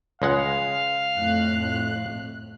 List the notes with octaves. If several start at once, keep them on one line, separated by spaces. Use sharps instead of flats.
C#2 G#3 F5 F#5
F2 A2 F#6